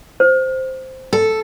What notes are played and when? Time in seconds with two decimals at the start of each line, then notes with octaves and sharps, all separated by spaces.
0.20 C5
1.13 A4